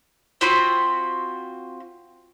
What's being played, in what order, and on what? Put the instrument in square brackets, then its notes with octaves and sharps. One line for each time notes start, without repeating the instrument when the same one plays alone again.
[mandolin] C4 F4 F#4 B5